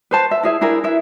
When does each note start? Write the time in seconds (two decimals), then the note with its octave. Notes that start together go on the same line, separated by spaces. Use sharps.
0.11 B4 C5 A5
0.31 E5
0.43 E4 G#4 E5
0.61 D4 E4 G#4 A#4
0.84 E4 B4 E5